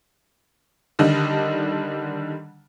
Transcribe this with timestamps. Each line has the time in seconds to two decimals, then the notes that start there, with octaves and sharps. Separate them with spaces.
0.99 D3 D#3 G3 D4 D#5